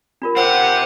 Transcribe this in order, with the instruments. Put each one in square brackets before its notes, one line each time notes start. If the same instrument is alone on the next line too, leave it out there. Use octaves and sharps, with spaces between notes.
[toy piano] D4 F4 A#4
[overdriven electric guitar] C4 G4 [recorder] C5 [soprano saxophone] F#5